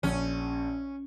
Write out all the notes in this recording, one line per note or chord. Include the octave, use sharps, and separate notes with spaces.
A#1 C#4